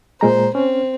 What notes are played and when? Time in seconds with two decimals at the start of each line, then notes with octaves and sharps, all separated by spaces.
0.21 A#2 G#3 C5 A#5
0.55 C4 C#4